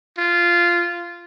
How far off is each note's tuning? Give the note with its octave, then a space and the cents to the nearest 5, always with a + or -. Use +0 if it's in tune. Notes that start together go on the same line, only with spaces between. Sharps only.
F4 -10